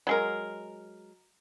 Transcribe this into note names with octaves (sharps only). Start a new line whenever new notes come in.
F#3 G#3 A#4